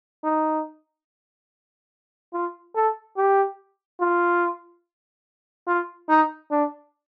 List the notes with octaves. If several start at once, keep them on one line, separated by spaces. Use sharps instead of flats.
D#4
F4
A4
G4
F4
F4
D#4
D4